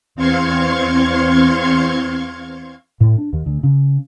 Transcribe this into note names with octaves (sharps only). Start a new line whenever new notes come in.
E2 C4 F5 C6 C#6 G#6
A2
D4
D#2
D2
C#3